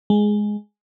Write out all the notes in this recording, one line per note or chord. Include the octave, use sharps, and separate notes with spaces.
G#3